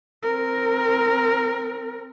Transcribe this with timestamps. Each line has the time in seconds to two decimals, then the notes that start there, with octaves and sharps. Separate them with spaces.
0.23 C4 A#4